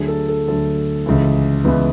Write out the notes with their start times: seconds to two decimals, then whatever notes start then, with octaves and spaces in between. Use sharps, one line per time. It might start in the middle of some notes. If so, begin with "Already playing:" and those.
Already playing: D2 D3 F#3 G#4
0.08 A4
0.28 A4
0.48 D2 D3 F#3 A4
1.06 C#2 C#3 E3
1.65 C#2 C#3 E3 B3